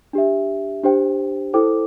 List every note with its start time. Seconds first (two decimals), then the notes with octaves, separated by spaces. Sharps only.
0.13 D4 G4 E5
0.83 D4 G4 C5 G5
1.54 E4 A4 C5 G5 D6